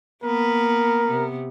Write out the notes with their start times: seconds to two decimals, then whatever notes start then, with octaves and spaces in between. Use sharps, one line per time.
0.24 A#3 B3 A#4 B4
1.07 C3 B3